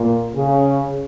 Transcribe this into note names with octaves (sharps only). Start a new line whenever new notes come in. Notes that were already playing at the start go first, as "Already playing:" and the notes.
Already playing: A#2
C#3